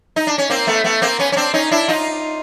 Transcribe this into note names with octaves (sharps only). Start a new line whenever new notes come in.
D#4
D4
C#4
A#3 C4
A3 B3
A3 B3
A#3 C4
B3 C#4
C#4
C4 D4
C#4 D#4
D4 E4
D#4 F4